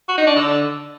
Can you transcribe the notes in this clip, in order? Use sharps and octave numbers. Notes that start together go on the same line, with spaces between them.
F#4
D#4
D4
D3